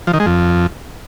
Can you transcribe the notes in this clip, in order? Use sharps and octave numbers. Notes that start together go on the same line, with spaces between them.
F3
D#3
G#3
F2